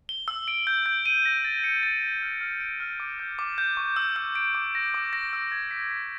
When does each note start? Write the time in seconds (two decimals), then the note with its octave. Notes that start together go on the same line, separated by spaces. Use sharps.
0.09 G7
0.28 E6
0.48 D7
0.67 G6
0.86 G6
1.06 D#7
1.25 A#6
1.45 A6
1.64 C#7
1.83 A6
2.03 A6
2.22 F6
2.41 F6
2.60 D7
2.80 F6
3.00 D6
3.19 G6
3.39 D6
3.58 G6
3.77 C#6
3.96 E6
4.16 E6
4.35 D7
4.55 D6
4.75 A#6
4.94 D6
5.13 A#6
5.33 E6
5.52 G#6
5.71 B6
5.91 B6